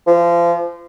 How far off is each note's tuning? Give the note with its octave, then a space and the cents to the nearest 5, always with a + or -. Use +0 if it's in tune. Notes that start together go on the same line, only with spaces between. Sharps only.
F3 -30